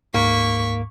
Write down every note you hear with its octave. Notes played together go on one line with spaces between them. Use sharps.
D2 G#2 A#3 C#6 B6